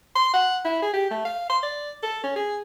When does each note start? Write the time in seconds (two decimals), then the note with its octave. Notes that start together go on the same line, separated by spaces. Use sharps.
0.16 C6
0.34 F#5
0.65 E4
0.82 G#4
0.94 G4
1.11 A3
1.25 F5
1.50 C6
1.63 D5
2.03 A4
2.23 C#4
2.36 G#4